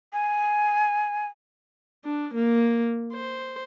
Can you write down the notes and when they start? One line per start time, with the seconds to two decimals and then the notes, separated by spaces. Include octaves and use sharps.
0.13 G#5
2.05 D4
2.34 A#3
3.13 C5